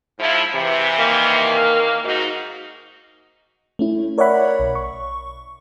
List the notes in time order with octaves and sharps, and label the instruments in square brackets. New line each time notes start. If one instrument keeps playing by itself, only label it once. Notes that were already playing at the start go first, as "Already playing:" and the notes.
[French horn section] G#2 F3 E4
C3 E3
[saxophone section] D#3 A#3
[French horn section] G#2 D#4 F#4
[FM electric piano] A3 C#4 E4
A#4 C#5 D5 E5 F#5 B5
B1
C#6